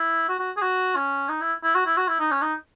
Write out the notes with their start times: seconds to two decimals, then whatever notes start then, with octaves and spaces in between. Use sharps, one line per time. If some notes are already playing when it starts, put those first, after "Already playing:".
Already playing: E4
0.29 F#4
0.39 F#4
0.57 G#4
0.62 F#4
0.95 C#4
1.29 D#4
1.41 E4
1.63 E4
1.75 F#4
1.86 E4
1.97 F#4
2.08 E4
2.20 D#4
2.31 C#4
2.42 D#4